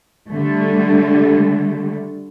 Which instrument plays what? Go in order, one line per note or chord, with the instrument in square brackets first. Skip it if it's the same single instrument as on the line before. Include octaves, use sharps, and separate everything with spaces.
[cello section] D3 G3 A3